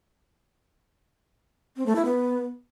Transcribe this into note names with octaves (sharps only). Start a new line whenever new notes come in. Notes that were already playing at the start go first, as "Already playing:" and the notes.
C4
A3
E4
B3